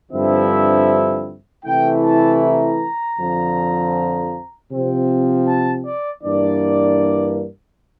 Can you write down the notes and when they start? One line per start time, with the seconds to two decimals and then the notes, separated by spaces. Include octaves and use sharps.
0.12 G2 D3 F3 C4 E4 E5
1.64 C3 E3 A3 E4 G5
2.03 A5
2.41 A#5
3.17 F2 D3 F3
4.70 C3 F3 C4
5.46 A5
5.84 D5
6.23 G2 E3 A#3 D4 D5